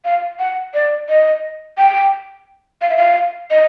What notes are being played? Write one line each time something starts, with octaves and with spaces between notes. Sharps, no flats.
F5
F#5
D5
D#5
G5
F5
E5
F5
D#5